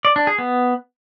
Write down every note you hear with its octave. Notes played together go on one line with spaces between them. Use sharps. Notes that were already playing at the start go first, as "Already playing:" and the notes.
D5
D4
G#4
B3